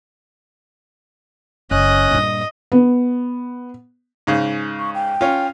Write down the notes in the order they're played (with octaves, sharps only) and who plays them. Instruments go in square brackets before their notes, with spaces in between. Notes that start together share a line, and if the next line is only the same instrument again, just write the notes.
[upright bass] F#1 [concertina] C#4 F#6 [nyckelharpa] D#5
[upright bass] G2 A#2
[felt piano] B3
[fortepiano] G#2 C#3
[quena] C#6
G5
[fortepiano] C#4 F4